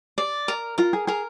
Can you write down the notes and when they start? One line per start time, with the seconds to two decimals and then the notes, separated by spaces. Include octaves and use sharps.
0.18 D5
0.48 A#4
0.78 F4 A#4
0.93 G#4
1.07 G#4 A#4